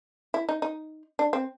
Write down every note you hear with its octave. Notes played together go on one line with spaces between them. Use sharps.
E4
D#4
D#4
D4
C4